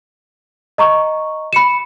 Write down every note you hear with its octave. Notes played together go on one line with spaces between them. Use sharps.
D#5 A#5 C#6
B5 C#7 E7